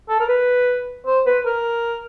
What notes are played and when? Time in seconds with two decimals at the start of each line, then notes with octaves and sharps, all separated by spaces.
0.09 A4
0.20 A#4
0.29 B4
1.06 C5
1.26 B4
1.46 A#4